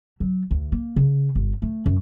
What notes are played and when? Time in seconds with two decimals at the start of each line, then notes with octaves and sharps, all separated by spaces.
0.20 F#3
0.51 D2
0.72 A#3
0.96 C#3
1.35 G1
1.62 A3
1.86 F#2